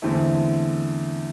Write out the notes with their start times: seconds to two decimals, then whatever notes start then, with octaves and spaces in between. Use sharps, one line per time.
0.02 E2 D3 A3 C4 E4